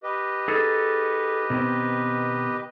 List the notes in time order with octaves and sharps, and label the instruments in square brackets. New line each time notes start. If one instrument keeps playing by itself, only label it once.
[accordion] G4 B4 D#5
[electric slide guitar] D#4 G#4 A4
B2 D#3 C4